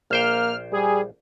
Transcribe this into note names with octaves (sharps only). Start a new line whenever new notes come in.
A#1 A#3 C5 G5 F6
G3 G#4